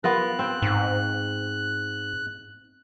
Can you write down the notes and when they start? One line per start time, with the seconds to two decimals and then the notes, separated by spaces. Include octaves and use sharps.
0.04 B3 F4 A#4 F#6
0.39 C4 G5
0.62 G#2